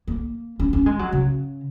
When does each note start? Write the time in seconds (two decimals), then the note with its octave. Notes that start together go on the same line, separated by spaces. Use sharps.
0.07 A#3
0.60 C#4
0.73 C#4
0.86 G#3
0.99 F#3
1.13 C#3